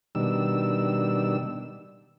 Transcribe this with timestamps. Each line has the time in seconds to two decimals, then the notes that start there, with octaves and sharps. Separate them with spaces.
0.15 B2 D#3 G3 D4 E6